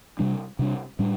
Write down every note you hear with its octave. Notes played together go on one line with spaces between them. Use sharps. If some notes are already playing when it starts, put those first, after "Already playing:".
C3 G3 D4
C3 G3 D4
A2 G3 D4